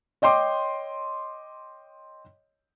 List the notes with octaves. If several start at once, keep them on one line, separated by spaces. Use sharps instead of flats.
C#5 D#5 G5 C6 D6